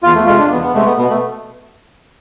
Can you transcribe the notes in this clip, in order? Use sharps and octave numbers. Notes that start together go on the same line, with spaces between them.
E2 F4
A3
C3 G#3 F4
D4
E2 B3
B3
C3 G#3 A3
B3
B2 B3
A3